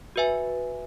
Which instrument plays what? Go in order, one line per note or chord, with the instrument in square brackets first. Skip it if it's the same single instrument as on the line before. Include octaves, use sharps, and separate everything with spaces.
[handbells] F#4 B4 E5 G#5